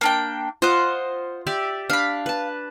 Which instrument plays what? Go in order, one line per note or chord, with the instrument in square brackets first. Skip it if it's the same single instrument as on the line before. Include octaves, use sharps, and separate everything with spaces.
[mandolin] A#3 D4 G5
[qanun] F4 D#5 [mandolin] C5 F#5
[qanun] G4 D5 E5
[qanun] D4 [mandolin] F5 B5
[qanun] B4 A5